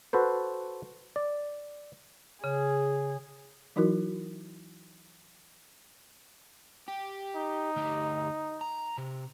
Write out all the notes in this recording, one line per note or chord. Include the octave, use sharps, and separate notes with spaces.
F#4 A4 B4 C5
D5
C#3 G#4
E3 F#3 D#4 E4 F#4 A#4
G4
D#4
D2 G4
A#5
C3